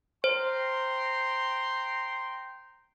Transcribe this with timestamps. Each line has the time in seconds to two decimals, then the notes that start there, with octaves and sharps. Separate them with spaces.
0.24 C5 G5 A#5 C6